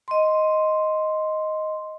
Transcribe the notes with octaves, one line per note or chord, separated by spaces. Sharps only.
D#5 C6